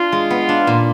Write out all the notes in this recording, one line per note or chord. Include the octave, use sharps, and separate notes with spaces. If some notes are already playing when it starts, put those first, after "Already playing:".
Already playing: D4 F4
G#3
B3
D4
A#2